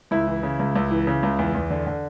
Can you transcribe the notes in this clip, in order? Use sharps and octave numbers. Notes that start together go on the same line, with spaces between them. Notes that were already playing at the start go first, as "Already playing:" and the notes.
C#2 E4
E3
C#3
C#2
C#2
E3
C#3
C#2
E2
E2
D3
D3